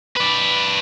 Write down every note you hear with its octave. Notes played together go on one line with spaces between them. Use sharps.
B4 D5